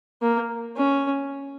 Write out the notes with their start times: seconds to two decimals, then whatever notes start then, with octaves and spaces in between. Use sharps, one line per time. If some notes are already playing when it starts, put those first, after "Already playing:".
0.22 A#3
0.76 C#4